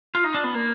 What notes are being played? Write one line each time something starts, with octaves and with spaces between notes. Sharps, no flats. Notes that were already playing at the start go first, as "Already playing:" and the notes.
F4
D#4
D4
B3
A#3